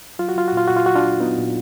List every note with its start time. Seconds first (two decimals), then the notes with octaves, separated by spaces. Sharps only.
0.19 F#3 F4
0.29 F#4
0.36 F#3 F4
0.48 F#4
0.53 A#2 F4
0.67 A#2 F#4
0.76 F4
0.86 F#3 F#4
0.96 D4 F4
1.04 F#3
1.20 F#3 B3 D#4
1.38 A#2